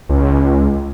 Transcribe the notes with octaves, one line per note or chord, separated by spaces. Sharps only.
C#2